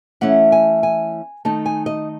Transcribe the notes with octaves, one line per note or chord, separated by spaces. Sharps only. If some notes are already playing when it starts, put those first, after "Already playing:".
E3 A3 C#4 E4 F#5
G#5
G#5
D#3 A3 D#4 A5
G#5
D#5